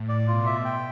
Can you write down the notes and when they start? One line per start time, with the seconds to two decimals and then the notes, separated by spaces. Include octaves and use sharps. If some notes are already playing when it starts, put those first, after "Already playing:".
Already playing: A2
0.09 D5
0.27 B2 F4
0.46 E5
0.65 G5